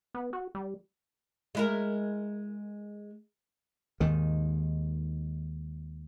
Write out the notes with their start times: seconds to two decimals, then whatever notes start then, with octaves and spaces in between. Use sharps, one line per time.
0.14 B3
0.33 F#4
0.55 G3
1.55 G#3 E4 A#4
4.00 D#2 G#2 D#3